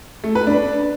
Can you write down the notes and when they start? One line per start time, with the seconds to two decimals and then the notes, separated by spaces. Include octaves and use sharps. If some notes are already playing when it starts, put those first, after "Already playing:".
0.24 A3
0.35 B4
0.47 D4